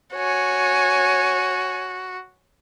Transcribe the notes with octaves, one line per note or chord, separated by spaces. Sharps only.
F#4 C#5 G#5